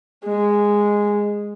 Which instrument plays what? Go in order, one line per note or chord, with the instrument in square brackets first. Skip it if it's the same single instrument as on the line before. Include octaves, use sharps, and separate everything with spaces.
[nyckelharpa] G#3